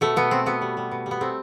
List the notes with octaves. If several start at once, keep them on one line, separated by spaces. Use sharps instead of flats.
B2 A3
B2 B3
B2 C4
B2 B3
G3
G3
B2
G3
B3
A3 C4